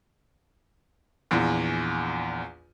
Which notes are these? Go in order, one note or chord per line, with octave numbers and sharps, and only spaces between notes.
A#1 E2